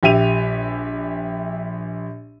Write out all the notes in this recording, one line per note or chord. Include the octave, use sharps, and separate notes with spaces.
A#1 G4 E5 D#7 F7